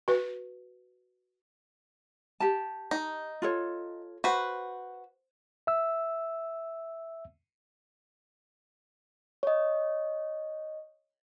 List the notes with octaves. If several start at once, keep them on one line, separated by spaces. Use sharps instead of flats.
F#4 B4
G4 A5
D#4
F4 A4 C#5
F#4 B4 C5
E5 E6
C#5 D#5